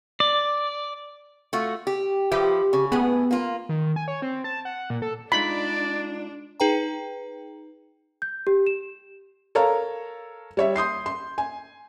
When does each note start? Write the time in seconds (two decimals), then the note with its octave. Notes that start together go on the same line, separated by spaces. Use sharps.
0.20 D5
1.53 A3 F4 F#4
1.87 G4
2.32 F3 G4 B4 E5
2.73 C#3
2.92 A2 B3 G#4
3.31 A#3 F4
3.69 D#3
3.96 G#5
4.08 C#5
4.22 C4
4.44 A5
4.65 F#5
4.90 A#2
5.02 A4
5.32 G#3 D4 D#4 F4 D5 B5
6.60 D#4 G#4 B4 G5 A#5
8.22 G6
8.47 G4
8.67 E7
9.55 A4 A#4 C#5 F5 A#5
10.57 G3 C#5 E5
10.76 C6 D#6 G6 C7
11.06 C6
11.38 G#5